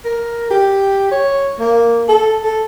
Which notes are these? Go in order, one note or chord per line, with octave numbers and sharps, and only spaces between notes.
A#4
G4
C#5
A#3
A4
A4